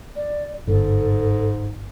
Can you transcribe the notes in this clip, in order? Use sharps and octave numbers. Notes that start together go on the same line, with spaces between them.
D5
G1 G#2 A4